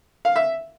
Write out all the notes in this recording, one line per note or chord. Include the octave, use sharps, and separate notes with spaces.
F5
E5